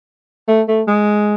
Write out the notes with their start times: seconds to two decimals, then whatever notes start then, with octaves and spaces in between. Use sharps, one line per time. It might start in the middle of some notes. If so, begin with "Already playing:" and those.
0.48 A3
0.68 A3
0.87 G#3